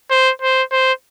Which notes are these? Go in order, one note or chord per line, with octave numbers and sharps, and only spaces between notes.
C5
C5
C5